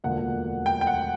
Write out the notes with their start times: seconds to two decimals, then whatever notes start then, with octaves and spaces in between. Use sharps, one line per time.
0.04 E1 D2 D3 F3 A#3 F#5
0.66 G5
0.81 G5
0.87 F#5